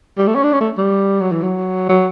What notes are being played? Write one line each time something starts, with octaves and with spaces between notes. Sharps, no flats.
G3
A3
C#4
D4
C#4
A3
G3
F#3
E3
F#3
F#3